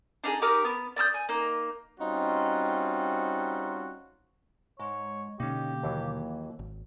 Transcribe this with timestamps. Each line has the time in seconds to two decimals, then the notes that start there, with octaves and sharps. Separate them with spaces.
0.24 D4 D#4 G4 G#4
0.41 D#4 G4 A#4 D6
0.65 B3
0.96 D5 D#6 E6 G6
1.14 G#5
1.29 A#3 D#4
2.00 G3 C4 C#4 D#4 F4 F#4
4.80 G#2 G#3 C#5
5.40 B2 D3 A#3 C#4 D#4 G4
5.84 D#2 E3 F#3
6.59 G#1